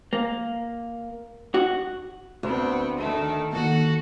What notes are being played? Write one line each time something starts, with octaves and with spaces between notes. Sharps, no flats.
A#3
F#4
D2 B3 C4
D#3 A3
D#3 A#3 F#4 A4 F#5